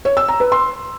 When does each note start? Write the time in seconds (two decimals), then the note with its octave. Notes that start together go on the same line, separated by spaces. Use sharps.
0.05 C#5
0.17 E6
0.28 A#5
0.40 B4
0.52 C6